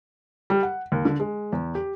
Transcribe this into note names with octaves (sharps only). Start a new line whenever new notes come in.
G3
F#5
D#2
D3
G#3
E2
G4